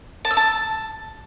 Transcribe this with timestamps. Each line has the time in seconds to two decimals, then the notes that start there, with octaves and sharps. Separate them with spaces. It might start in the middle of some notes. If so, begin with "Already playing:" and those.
0.25 A5
0.31 E6
0.37 A5